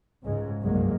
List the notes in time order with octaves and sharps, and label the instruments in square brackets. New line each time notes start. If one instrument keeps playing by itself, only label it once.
[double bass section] C#2 G#2 C#3 G#3
F#1 C2 G2 F#3 G#3 A#3